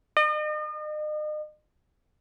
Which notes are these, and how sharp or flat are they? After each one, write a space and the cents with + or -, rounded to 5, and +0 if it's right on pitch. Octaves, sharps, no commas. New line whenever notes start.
D#5 -40